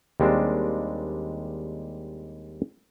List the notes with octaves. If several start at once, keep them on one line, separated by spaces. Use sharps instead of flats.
D#2 G3 G#3 C4 D4